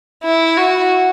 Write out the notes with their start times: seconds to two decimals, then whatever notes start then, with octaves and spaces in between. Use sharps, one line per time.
0.23 E4
0.57 F#4